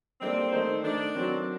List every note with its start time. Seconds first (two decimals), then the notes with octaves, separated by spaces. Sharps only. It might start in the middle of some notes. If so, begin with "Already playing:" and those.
0.21 G3 A#3 C4 D4 A4
0.52 D#3 A3 D#4 A4 C5
0.83 D#3 A3 D4 D#4
1.14 D#3 F#3 C4 F#4